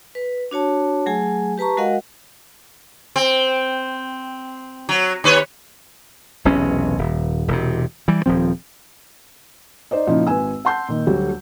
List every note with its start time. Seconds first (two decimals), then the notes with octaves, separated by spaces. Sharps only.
0.15 B4
0.51 D4 F#4 C#5 A5
1.06 F#3 A3 G#4 G#5
1.58 G4 B4 A5 A#5 C#6
1.77 G#3 F#4 A#4 D#5 F5 F#5
3.16 C4
4.89 F#3
5.24 D#2 B4 C#5
6.45 E1 B1 C3 C#4
6.98 D#1
7.48 E1 C3
8.08 E3 G3
8.26 D#1 F3 C4
9.91 D#4 C5 D5 D#5
10.07 A#2 C#3 F3 D#4 E4
10.27 G#1 B4 G#5 E6
10.65 F#5 A5 C6 G6
10.89 A#2 D#3
11.07 D2 F#3 G3 A3